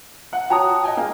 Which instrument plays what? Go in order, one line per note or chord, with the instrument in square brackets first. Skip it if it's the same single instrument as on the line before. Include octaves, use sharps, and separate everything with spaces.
[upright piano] F#5
[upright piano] F#4 C#5 A#5 [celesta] G5 A5 D#6
[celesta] D#6
[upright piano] D#5 G5 G#5
G#3 A#3 F5